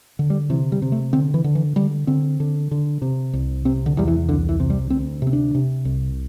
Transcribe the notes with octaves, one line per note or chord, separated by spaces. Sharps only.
D3
G3
C3 E3
G3
C3
A3
D3 C4
E3
D3
E3
D3 G3
D3 C4
D3
D3
C3
C2
C3 C4
D3
E2 G3
E3
C2 D3
E3
C3
G3
D2 C4
C3 C4
D4
C3
C2